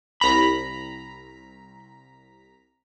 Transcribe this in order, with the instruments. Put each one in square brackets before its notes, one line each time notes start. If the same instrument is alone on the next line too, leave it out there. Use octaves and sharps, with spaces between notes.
[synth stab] C2 A#5 B6 [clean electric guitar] B5